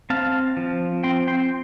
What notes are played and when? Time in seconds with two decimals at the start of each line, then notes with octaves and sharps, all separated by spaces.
0.10 C4 F5 A5
0.57 F3
1.03 C4 G5 C6
1.27 G5 C6